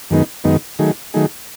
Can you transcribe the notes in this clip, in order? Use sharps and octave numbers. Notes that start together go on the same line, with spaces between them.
F#2 D#3 G#3 B3 D#4
F#2 D#3 G#3 B3 D#4
D#3 F#3 A3 D#4 G#4
D#3 F#3 A3 D#4 G#4